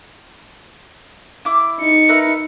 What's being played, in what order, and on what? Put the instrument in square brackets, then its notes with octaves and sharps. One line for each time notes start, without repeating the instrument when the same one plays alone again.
[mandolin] E4 D6
[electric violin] D#4 C#7
[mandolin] A#4 B4 E5